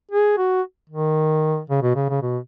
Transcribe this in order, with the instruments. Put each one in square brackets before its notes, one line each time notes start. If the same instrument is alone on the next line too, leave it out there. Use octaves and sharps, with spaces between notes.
[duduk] G#4
F#4
D#3
C#3
B2
C#3
C#3
B2